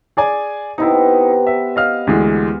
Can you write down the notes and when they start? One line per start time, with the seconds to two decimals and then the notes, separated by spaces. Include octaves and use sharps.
0.17 G#4 D5 G#5
0.78 C3 B3 D#4 E4
1.47 B4 E5
1.76 D#5 F5 F6
2.07 D2 E3 G#3